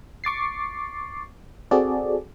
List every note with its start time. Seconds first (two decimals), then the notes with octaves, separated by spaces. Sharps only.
0.24 C#6 D6 A6 C7
1.71 C4 F#4 G#4 A4 D5